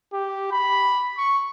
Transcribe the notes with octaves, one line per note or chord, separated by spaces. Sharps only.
G4
B5
C#6